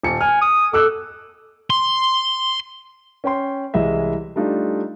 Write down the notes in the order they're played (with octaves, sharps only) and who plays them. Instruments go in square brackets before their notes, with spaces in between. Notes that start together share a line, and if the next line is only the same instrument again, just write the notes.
[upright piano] D#1 C#7
[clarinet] G#5 [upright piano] F6
[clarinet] D#6
[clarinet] A4 [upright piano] D6 E6 F#6
[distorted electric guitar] C6
[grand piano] C#4 G5 C6
C2 E3 G#3 D#5 E5
G3 A3 D4 D#4 F4